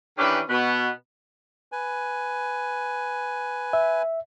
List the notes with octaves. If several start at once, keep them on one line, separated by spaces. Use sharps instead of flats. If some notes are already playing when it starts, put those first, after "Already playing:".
D#3 E3 C#4 D4 G4 B4
B2 B3
B4 G#5
E5